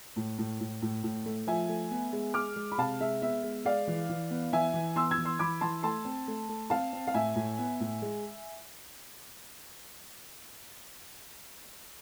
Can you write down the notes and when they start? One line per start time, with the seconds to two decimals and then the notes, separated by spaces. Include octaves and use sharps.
0.16 A2
0.38 A2
0.60 A2
0.82 A2
1.03 A2
1.26 A3
1.47 F3 E5 G#5
1.69 A3
1.91 B3
2.13 G#3
2.34 G#3 D6 F6
2.56 G#3
2.72 B5
2.78 C3 F5 A5
3.00 G#3 E5
3.21 B3 E5
3.44 G#3
3.65 G#3 D5 F5
3.87 E3
4.09 E3
4.30 B3
4.53 E3 E5 G#5
4.74 E3
4.96 B3 C6 E6
5.11 E6 G#6
5.18 E3
5.25 C6 E6
5.39 E3 B5 D6
5.61 E3 A5 C6
5.83 A3 A5 C6
6.05 C4
6.28 A3
6.49 A3
6.70 C4 F5 A5
6.93 C4
7.07 F5
7.14 A2 E5 G#5
7.36 A2
7.58 B3
7.80 A2
8.02 G#3